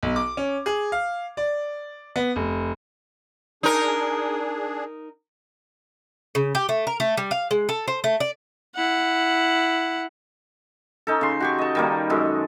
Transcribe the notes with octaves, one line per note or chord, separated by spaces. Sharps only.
B1
D6
C#4
G#4
F5
D5
B3
F1
D4 D#4 G#4 A#4
C#3
G4
A3
A#4
A3
G3
F5
G#3
A4
C5
A3
D5
E4 F#5
C#4 D#4 A4
C#3 C6
F#4 G4 C#6
D#5 A5
D#3 G3 A#3
F#2 G#3 A4